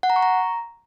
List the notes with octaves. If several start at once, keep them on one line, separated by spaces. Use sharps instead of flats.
F#5
A#5
C#6
A#5